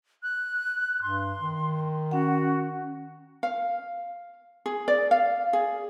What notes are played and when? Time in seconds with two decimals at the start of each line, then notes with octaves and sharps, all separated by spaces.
0.23 F#6
1.02 G2 C6
1.39 D#3
2.11 C#4 F#4 F#5
3.43 F5
4.66 G#4
4.88 D5
5.11 F5
5.53 G#4